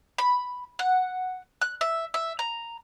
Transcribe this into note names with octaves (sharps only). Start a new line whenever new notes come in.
B5
F#5
F#6
E5
E5
A#5